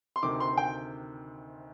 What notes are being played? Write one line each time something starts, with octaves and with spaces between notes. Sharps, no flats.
C6
D2 C3 D#3 D6
C6
G5